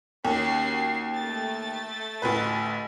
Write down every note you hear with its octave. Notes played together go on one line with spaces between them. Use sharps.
D#2 C#4 F#4 C7
A3 A6
A1 D2 B4